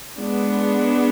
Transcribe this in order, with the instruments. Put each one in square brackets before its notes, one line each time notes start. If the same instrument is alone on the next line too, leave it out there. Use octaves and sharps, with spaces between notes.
[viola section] G#3 B3 D4